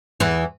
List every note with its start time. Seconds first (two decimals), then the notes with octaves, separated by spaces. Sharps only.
0.20 E2 E3